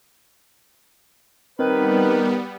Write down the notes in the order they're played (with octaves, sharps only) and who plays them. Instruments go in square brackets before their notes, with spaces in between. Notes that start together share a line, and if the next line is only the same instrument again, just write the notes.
[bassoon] D#3 [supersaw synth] G3 B3 [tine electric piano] C4 D#4 [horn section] B4